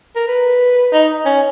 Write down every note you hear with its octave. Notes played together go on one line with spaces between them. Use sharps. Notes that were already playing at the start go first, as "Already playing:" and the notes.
A#4
B4
D#4
C#4